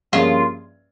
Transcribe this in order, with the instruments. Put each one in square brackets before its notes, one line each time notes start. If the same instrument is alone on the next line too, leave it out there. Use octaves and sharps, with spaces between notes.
[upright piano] G2 F3 A#3 C#4 G#4 [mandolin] F4